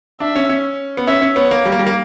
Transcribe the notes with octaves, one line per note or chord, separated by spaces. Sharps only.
D4 E5
C#4
C#4
B3
C#4 E5
C#4
B3 C#5
A#3
G3
A#3
G3
A#3